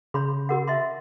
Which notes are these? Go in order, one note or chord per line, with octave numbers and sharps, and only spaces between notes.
C#3 C#5 B5 C6
F#4 A#4 F#5
D#5 E5 C6